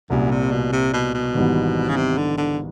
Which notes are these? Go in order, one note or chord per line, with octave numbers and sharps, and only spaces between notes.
C2 F#2 A#2 G3
C3
B2
C3
B2
B2
G#1 G#2 E3 G3 B3
C#3
C3
D3
D3